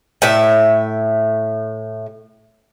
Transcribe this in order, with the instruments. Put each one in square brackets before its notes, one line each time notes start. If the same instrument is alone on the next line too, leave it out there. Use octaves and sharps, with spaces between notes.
[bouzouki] A2 E5